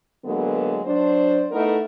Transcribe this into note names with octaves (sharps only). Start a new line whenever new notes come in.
D3 F#3 G#3 A#3 B3
F#3 D4 C5
A3 B3 D#4 E4 A#4